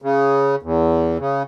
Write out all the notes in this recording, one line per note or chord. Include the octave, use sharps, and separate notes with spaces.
C#3
E2
C#3